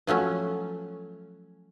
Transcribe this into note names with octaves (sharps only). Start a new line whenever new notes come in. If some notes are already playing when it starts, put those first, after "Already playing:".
F3 F#3 A3 C#4